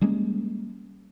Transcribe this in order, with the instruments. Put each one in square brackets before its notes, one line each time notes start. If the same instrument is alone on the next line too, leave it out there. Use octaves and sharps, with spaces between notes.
[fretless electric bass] G3 G#3 A#3 C#4